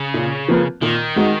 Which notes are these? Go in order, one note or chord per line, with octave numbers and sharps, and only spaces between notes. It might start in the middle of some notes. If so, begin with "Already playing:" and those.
Already playing: C#3
A#2
F3 A#3 F4 B4
A#2 D#3
G#3 D#4 F#4